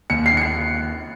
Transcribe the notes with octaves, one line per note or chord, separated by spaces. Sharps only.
D#2 C#7
C7
D#2 C#7
C7